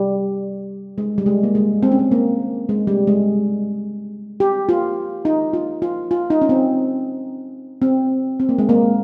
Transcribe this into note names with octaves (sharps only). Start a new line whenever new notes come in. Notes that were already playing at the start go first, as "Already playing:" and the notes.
Already playing: G3
G#3
G3
G#3
A#3
G#3
C4
C#4
C4
A#3
G#3
G3
G#3
G4
F4
D#4
F4
F4
F4
D#4
C#4
C4
C4
C4
A#3
G#3
A#3